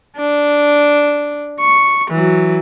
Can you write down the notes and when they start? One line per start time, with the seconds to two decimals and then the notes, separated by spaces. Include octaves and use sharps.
0.18 D4
1.61 C#6
2.11 E3 F#3